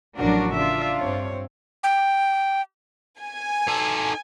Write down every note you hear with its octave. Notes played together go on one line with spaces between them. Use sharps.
A1 F3 F#3 D4 F#4 A#4
C#3 D4 F4 E5
G2 C4 C#5
G5
G#5
D#4 A4